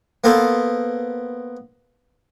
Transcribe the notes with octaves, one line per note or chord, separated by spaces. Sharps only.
A#3 B3 A4 C5